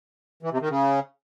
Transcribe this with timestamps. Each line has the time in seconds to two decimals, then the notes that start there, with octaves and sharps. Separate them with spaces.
0.43 E3
0.52 C3
0.61 D#3
0.70 C#3